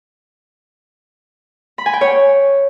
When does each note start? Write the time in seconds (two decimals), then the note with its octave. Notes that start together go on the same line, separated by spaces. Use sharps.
1.78 B5
1.86 G#5
1.93 G5
2.01 C#5